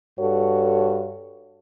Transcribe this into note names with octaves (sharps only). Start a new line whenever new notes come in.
G2 F#4 A4 C#5